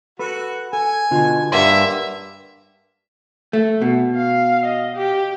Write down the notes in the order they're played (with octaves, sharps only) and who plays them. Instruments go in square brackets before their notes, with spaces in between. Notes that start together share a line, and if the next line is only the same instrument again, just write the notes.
[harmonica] F#4 [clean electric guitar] A4 B4
[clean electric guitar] A4 [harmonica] G#5
[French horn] B2 [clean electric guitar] D3 F4 F#4
[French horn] G2 [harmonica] A#3 [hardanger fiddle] E5 [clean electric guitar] F#5 C6
[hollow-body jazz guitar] A3
B2
[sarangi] F5
D#5
G4